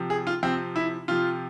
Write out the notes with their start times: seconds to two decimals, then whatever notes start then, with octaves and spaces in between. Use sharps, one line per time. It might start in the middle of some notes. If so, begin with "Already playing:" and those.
Already playing: C3 F3
0.10 G#4
0.27 F4
0.43 C3 F3 C4
0.76 E4
1.08 C3 F3 F4